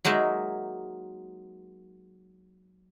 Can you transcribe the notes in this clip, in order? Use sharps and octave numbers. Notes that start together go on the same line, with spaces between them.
F#3 G#3 A#3 D#4 E5